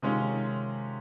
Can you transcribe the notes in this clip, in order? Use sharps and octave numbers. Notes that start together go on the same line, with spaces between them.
C3 D#3 G#3 C#4 F4